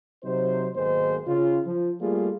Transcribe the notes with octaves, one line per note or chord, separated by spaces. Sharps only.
C3 F#3 D#4 C5
B1 G#2 D#3 G#3 A#3 C5
C#3 F4
F3
G3 A3 A#3 F4 G#4